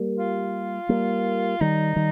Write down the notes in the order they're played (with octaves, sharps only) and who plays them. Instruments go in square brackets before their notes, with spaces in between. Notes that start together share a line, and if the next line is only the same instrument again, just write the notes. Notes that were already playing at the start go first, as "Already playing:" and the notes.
Already playing: [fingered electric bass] G3 A#3
[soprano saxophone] F4
[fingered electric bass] G3 A#3
[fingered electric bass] D#3 G3 [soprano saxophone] D#4
[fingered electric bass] D#3 G3